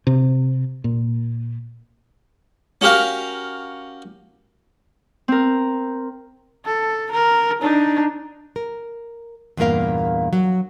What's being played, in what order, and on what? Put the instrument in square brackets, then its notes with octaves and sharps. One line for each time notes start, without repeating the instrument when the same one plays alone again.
[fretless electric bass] C3
A#2
[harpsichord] C#4 F#4 G4 A#4 F5
[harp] C4 A#4
[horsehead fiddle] A4
A#4
D4 D#4
[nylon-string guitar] A#4
E2 G2 A#2 A#3 A#4 F5
F#3